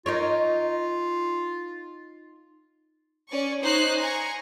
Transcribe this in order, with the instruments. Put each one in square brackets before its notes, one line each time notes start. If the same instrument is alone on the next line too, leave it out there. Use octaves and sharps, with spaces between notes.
[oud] D#4 A#4 C#5 [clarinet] F4
[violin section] C#4 D5 C#6
D#4 C5 C#5 F#6 C7
G#5 A#5 C#6